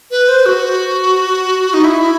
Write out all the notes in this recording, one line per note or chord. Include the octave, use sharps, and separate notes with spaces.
B4
C5
F#4
D#4
E4